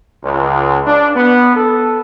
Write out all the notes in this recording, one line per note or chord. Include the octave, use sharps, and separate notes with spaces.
C#2
D4
B3
A4